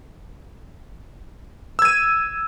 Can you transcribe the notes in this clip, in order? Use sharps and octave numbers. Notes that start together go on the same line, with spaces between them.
E6 G#6 D#7